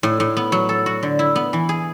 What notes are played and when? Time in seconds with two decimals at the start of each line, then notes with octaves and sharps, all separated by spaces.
0.03 A2
0.20 A2
0.37 B3
0.52 F#3
0.69 A4
0.86 F#4
1.03 D3
1.19 E4
1.35 B3
1.53 E3
1.69 G#4